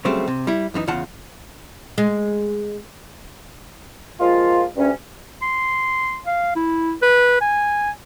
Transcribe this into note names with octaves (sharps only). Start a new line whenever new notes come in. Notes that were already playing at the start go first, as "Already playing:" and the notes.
C#3 F#3 G3 A3 C4
C3
G3 E4
F#2 E3 A#3 D#4
E2 C#3 F4 F#5 A5
G#3
F3 G#3 A#3 F4
D2 G2 C#4
C6
F5
E4
B4
G#5